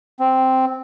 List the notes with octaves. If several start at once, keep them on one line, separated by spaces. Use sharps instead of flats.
C4